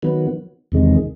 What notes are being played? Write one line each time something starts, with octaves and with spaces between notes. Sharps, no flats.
D#3 F#3 B3
E2 C3 D#3 G#3